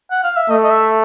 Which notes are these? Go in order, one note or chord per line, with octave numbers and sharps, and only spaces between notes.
F#5
F5
E5
A3 D#5
D#5
E5